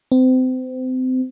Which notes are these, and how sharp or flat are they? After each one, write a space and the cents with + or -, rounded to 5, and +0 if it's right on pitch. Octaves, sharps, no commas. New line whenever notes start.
C4 -30